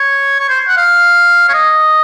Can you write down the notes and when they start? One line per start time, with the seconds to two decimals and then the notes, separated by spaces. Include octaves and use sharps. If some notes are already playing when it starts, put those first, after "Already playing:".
Already playing: C#5
0.39 C#5
0.49 C5
0.68 F#5
0.77 F5
1.49 C#5
1.53 D#5